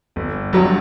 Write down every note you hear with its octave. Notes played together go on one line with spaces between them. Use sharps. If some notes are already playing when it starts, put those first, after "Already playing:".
G1
G2 F#3